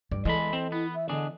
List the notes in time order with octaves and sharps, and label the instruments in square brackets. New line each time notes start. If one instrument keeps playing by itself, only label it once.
[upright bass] G2 [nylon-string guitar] D5
[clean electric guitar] E2 G#3 B5 [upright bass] E3 [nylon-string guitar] A4 D#5
[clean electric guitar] C4
[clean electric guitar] B3 [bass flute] E4
[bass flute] E5
[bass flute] D3 [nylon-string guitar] B3 D#5 [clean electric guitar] D4 G#4